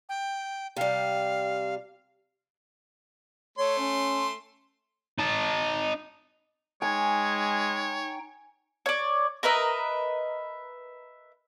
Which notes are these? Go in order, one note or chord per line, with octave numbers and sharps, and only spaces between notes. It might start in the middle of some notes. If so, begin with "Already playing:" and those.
G5
C3 G3 F5
A3 C#5 C6
C#4
D#4 A5
G#3 D#4 C#5 G5 G#5
C#5 D5
A#4 B4 D#5 E5